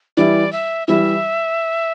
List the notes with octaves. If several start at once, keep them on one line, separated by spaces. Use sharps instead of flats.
E3 G3 E4 D5
E5
E3 G3 E4 E5